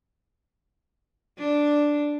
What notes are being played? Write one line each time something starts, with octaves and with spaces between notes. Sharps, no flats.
D4